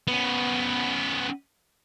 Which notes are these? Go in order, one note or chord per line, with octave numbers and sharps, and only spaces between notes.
B3 C#4